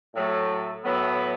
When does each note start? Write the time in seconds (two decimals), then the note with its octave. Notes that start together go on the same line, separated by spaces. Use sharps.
0.14 A2 F#3 A3
0.84 A2 F#3 B3